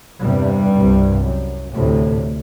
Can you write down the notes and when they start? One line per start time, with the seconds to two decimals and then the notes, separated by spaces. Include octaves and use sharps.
0.21 E2 G2 C3 G3
0.73 C2 C3
1.24 F#2
1.74 D2 A2 C3 A3